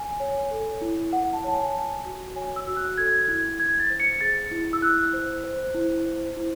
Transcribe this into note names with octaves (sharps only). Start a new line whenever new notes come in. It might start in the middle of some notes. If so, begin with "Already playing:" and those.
Already playing: G#5
C#5
A4
E4
E4 F#5
A5
C#5 A5
G#5
C#5
F#4
C#5 G#5
E6
F#4
F#6
A4 G#6
E4
E4 G#6
A6
C5
C#7
G#4 A6
E4
E6
E4 F#6
C5
C5
E4
C5
E4